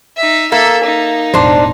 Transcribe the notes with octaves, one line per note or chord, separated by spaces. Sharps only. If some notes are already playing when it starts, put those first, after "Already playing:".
D#4 E5
A#3 A4 E5
D#4
E1 A1 D4 C5